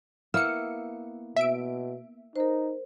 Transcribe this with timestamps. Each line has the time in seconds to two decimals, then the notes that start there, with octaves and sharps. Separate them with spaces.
0.34 A#3 B3 E4 E6 F6 C#7
1.36 B2 E5 D7
2.36 D#4 A#4 C5